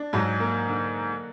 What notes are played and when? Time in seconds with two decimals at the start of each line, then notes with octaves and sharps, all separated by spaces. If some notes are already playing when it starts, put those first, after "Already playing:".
Already playing: D4
0.13 G#2 F#3
0.40 A#3
0.68 D3